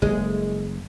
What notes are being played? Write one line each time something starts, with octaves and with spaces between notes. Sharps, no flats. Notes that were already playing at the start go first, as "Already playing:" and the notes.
F#1 G#3